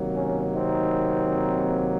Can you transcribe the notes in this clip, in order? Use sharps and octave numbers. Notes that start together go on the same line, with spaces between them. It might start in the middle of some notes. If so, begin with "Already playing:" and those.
Already playing: C3 D#3 F#3 A#3
C#4
C4 D#4